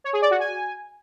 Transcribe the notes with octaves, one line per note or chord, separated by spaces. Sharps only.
C#5
G#4
D5
F#4
G#5